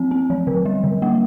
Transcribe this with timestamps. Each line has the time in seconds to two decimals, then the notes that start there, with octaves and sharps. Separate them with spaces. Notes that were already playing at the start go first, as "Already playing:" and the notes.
Already playing: F3 C4
0.11 C4
0.30 F3
0.47 D3
0.66 G3
0.84 D3
1.02 A#3